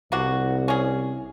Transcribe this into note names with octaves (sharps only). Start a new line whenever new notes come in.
C2 B2 A#3 F#4
C#4 G#4